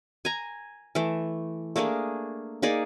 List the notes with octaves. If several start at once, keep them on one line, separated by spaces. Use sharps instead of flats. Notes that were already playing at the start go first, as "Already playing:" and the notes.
G#5 A#5
E3 A3
A3 A#3 D4 G#4
A#3 D#4 G#4 D5